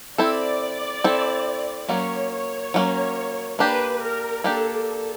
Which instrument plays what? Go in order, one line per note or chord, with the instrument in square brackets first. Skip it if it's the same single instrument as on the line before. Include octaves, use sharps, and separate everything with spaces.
[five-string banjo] C4 E4 A4 [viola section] D5
[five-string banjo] C4 E4 A4
[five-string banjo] F#3 A#3 C#4 [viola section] C#5
[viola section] C#5
[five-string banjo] F#3 A#3 C#4
[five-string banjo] A#3 D4 G4 [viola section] B4
[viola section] A#4
[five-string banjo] A#3 D4 G4 [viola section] A4
[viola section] A4